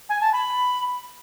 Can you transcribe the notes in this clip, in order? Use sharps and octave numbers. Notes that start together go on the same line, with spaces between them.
G#5
A5
B5